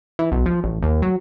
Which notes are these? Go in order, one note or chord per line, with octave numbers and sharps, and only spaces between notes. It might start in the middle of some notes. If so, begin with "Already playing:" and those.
E3
B1
F3
A1
D#2
F#3